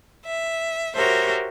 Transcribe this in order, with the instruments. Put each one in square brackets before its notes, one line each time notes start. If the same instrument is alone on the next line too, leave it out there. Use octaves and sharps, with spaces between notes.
[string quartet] E5
F#4 G4 A#4 C5 C#5 E5